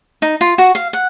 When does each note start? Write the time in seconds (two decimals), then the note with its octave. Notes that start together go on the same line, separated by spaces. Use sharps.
0.22 D#4
0.41 F4
0.58 F#4
0.75 F5
0.93 F#5